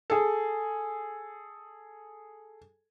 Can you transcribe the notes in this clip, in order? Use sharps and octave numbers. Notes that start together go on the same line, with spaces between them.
G#4 A4